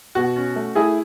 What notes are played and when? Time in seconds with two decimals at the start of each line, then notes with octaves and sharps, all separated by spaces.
0.15 B2 F#4
0.36 C#4
0.56 A3
0.75 A3 E4 G#4